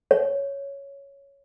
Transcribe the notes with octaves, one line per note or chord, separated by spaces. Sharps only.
C#5